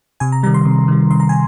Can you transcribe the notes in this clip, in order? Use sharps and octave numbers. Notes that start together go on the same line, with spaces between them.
C3 G#5
A#5
D#3 G3 A#5
C6
C3
D#3 G3
C3 C6
A#5
G#5